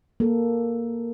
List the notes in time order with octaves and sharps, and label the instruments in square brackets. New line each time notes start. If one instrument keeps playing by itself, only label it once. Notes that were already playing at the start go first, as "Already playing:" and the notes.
[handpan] A#3 A4